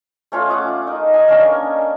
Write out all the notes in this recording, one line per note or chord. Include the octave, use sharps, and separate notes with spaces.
A3 C#4 F4 F5
F#5 D6 D#6
D#4 A#4
D#5 G#5
A#3 C#4 D4 A#4